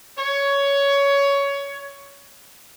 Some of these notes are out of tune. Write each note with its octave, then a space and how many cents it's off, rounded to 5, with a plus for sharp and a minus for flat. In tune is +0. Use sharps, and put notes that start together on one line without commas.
C#5 +15